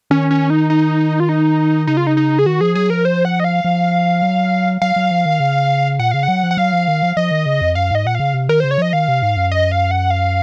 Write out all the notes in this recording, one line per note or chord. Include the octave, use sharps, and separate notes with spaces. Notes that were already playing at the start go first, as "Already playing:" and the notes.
D#3 C#4
C#4
D#4
D#4
F4
D#4
C#3 D#4
F4
D#4
D#4
G#4
D#3 F#4
F3 G#4
F#3 G#4
F3 A#4
C5
F#5
D#5
F5
F3
F#3
F#3 F5
F#3
F3
D#3
C#3
A#2 F#5
C#3 F5
F#5
F#3
F3
F#5
F#3 F5
F3
D#3
F3
F3 D#5
D#3
C#3
F2
F#2 F5
G#2 D#5
A#2 F#5
C#3 F5
C3
D#3 A#4
C#3 C5
C#5
F3 D#5
D#3 F5
C3
G#2
F#2
D#5
F5
F#5
F5